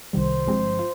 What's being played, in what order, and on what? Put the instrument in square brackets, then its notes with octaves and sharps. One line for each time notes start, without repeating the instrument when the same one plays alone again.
[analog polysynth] C2 C3 D#3 G3 [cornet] C5
[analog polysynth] G1 G2 F3 G#3 C4
F4